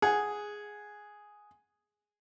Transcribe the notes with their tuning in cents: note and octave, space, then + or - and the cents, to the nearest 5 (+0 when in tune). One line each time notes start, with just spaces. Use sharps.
G#4 +0 F#5 -5